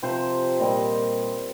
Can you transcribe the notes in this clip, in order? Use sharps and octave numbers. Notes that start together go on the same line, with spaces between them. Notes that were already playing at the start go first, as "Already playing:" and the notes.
C3 F3 C4 C5
A#2 G3 C4 D#5